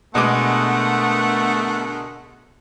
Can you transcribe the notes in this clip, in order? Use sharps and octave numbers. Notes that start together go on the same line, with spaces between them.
B2 D3 G#3 A3 B3 A#4 F#5 D6